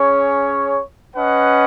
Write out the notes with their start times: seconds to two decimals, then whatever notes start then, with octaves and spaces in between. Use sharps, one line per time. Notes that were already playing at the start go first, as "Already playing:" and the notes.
Already playing: C#4 G#4 C#5
1.16 C#4 B4 D#5 F#5